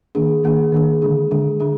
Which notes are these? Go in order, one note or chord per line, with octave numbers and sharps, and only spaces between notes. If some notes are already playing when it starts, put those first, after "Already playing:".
D#3 A#3 D4 G#4
D#3 A#3 D4 G#4
D#3 A#3 D4 G#4
D3 G#3 D4 G#4
D3 G#3 D4 G#4
D3 G#3 D4 G#4